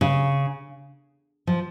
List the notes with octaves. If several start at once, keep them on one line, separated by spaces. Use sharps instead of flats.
C#3
F3